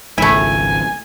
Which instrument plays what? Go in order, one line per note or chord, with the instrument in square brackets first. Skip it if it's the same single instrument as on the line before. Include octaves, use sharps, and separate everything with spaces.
[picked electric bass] G#1 C#2 [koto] A3 E4 [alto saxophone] G#5